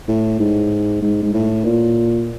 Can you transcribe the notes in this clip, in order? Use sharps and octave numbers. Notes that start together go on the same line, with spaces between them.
A2
G#2
G#2
G#2
A2
A#2